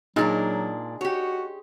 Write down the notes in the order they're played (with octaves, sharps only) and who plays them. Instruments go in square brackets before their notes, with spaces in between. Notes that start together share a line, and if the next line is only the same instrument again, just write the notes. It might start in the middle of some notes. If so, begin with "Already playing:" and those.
[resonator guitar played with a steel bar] A#2 D4 A#4 [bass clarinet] F#3 [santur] G#3 G#4 [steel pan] D#4
[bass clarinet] F#4 [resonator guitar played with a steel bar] G4 C#5